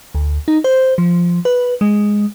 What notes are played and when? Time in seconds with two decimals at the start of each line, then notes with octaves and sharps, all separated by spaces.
0.15 D2
0.48 D#4
0.64 C5
0.98 F3
1.45 B4
1.81 G#3